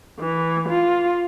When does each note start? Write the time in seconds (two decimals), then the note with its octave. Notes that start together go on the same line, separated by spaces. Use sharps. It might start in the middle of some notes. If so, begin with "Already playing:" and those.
0.19 E3
0.69 F4